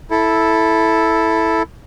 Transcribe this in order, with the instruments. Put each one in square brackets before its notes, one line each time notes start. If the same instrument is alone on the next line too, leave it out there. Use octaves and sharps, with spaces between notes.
[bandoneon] E4 A4